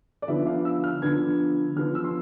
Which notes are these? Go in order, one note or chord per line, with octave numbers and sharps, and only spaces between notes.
D5
D3 F3 B3 D4 E5
F5
E6
F6
D3 F3 B3 D4 G#6
D3 F3 B3 D4 F6
E6
C6